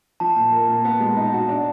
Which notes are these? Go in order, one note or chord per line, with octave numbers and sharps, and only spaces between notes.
F3 A5
A#2
A#3
A#2
B3
G#3
D#4
F#4
D4